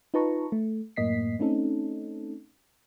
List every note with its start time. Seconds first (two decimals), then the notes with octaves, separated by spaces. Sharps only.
0.14 D#4 F4 B4 A5 A#5 C#6
0.52 A3
0.96 F#2 A2 A#3 D#5 B6 C7
1.39 A3 C4 C#4 D#4 A4